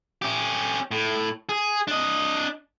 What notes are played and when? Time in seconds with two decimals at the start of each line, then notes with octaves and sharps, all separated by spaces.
0.22 C#4 G4
0.91 A2
1.49 G#4
1.88 D4 D#5